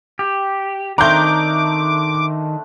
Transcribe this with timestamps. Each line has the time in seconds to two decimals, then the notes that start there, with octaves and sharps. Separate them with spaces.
0.19 G4
0.98 D#3 A3 C4 D4 A#5 D6 G6